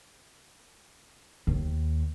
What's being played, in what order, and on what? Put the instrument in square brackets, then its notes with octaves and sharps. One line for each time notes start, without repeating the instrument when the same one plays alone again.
[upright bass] D#2